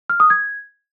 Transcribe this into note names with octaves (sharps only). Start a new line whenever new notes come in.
F6
D#6
G#6